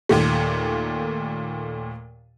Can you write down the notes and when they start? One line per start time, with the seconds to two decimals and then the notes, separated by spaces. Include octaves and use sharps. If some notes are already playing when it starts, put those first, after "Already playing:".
0.09 D#2 A#2 A3